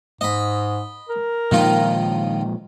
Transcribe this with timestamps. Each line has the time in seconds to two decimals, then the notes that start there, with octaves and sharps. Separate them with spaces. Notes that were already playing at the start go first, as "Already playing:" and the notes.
0.21 G#2 D#5 B5
1.09 A#4
1.51 A#2 D#3 F3 G#3 F4